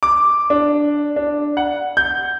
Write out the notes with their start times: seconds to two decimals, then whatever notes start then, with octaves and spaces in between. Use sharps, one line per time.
0.03 D6
0.50 D4
1.16 D4
1.57 F#5
1.97 G6